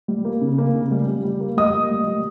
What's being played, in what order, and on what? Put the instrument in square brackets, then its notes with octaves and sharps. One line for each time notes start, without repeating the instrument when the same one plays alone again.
[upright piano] G3
A#3
C#3
A#3
C#3
G3
G3
G3
A#3
G3 D#5 D#6
A#3
G3
G3